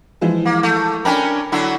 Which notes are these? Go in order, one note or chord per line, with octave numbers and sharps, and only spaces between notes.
E3 F3 G#3
A#3
A3
C#4 D4 A#4 G5 G#5 B5
D3 F#3 E4